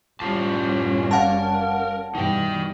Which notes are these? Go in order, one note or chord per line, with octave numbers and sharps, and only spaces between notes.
F#1 A2 G3 C#4 F4 A5
A#4 F5 F#5 A5
G2 B2 E3 D#4 G5